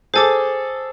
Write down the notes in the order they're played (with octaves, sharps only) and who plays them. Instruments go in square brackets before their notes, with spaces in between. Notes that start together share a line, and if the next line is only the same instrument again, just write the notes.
[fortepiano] G#4 A4 [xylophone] C5 G#5 D6